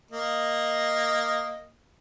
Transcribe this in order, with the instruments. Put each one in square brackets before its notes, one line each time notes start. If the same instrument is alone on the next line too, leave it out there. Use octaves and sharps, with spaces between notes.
[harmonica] A#3 D#5